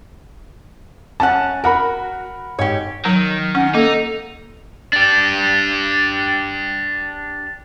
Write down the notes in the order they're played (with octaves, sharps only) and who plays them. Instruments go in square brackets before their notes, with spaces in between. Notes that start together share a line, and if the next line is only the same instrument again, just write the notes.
[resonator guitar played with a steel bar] F#2 C#4 F#5 [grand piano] A5
[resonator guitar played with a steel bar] F#4 [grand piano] A#4 F#5 B5
[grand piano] G#2 [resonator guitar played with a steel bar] G4 C#5
[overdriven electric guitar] D#3 [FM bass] F#3
[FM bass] C#4 [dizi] F#5
[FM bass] A#3 [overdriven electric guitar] D#4 [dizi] A4
[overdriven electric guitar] D4 G4